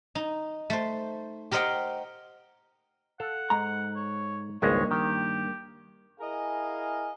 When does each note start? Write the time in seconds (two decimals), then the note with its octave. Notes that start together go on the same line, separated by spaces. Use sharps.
0.15 D#4
0.70 A3 C5
1.51 G4 A#4 C5 D#5 F#5 G5
3.20 A4 F5 F#5
3.50 G#2 A#5
3.96 C#5
4.62 G#1 C#2 G2 G#3 A#3 C#5
4.91 D#3 G4
6.21 E4 G#4 A#4 D#5 F5 G#5